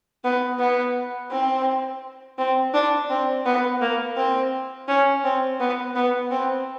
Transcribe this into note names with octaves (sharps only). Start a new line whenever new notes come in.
B3
B3
C4
C4
D4
C4
B3
A#3
C4
C#4
C4
B3
B3
C4